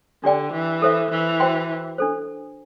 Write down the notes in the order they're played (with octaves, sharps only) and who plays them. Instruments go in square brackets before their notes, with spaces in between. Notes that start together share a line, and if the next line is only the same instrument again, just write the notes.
[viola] D3 [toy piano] D4 G4 D5 G5
[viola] E3
[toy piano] A4 C5 E5
[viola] E3
[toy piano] F#4 C5 G5 C6
D4 A4 C5